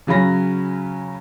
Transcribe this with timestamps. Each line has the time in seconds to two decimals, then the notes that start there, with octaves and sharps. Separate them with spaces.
0.07 C#3 F#3 C#4 B5 A#6